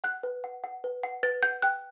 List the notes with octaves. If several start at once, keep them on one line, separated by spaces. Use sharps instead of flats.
F#5 F#6
B4
F#5
F#5
B4
F#5
B4 A6
F#5 G6
G5 F#6